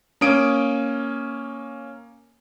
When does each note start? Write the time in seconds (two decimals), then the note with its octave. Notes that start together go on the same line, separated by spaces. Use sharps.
0.21 A#3 C#4 D#6 D7